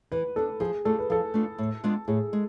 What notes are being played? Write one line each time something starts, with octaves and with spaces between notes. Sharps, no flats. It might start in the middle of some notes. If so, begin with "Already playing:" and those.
E3 B4
B3 D4 A4
F3 G#4
A3 D4 F4 A4
B4
F3 A4
A3 D4 F4
A2
G#3 B3 D4 F4
A2 G#4
G#3